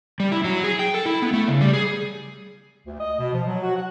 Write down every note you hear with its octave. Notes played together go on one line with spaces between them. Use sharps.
G3
E4
F#3
G#4
G5
A4
E4
B3
A3
C#3
G3
G#4
D2
D#5
B2
F3
F#3
F#4
F#5